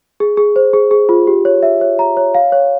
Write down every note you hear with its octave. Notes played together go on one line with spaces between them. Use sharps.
G#4
G#4
C5
G#4
G#4
F4
G4
C#5
E5
C#5
A#5
C#5
F5
C#5